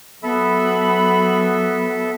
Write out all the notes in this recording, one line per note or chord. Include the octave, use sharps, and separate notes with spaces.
F#3 B3 A4 E5 B5